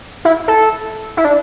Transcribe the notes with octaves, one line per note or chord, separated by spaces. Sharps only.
E4
A4
E4
D4